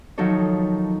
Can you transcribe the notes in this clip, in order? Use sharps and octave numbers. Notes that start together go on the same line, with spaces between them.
D#3 F3 F#3 D#4 A4 C#5